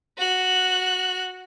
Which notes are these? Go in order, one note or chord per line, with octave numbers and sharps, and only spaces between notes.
F#4 F#6